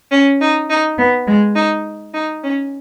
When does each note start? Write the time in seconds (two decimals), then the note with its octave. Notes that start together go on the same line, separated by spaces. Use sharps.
0.11 C#4
0.40 D#4
0.70 D#4
0.98 B3
1.27 G#3
1.55 D#4
2.13 D#4
2.43 C#4